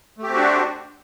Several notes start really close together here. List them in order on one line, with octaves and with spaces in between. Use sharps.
A3 G4 C4 F#4 D4